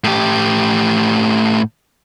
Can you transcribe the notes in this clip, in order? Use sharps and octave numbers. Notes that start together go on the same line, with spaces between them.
A2 G4